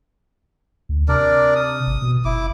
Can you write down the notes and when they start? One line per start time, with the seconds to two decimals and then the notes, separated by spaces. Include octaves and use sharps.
0.89 D2
1.08 C3 D4 A#4 D5
1.55 D#6
1.87 G#1
2.02 B2
2.25 F#1 E4 D6